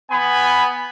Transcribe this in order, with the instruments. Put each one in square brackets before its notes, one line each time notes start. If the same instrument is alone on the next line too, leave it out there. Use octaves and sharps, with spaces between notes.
[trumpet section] B3 G#5 B5